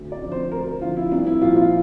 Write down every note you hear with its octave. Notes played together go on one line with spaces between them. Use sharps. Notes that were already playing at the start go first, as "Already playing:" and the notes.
Already playing: D2
D5
D3 F3
C5
D2 A#4
D3 F3 F4
E4
C2 D4
E4
A#2 F3 F4
F4